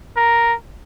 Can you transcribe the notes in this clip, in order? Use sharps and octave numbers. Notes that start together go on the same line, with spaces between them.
A#4